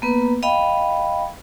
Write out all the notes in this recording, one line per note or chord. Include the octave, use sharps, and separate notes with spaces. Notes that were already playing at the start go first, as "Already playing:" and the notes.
A#3 B3 B4
D#5 F5 G5 B5